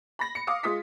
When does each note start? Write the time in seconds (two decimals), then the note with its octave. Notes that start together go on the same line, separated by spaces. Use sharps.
0.19 B5 A#6
0.35 C#7
0.47 F5 D6 D#6
0.63 G#3 F4 D#6 B6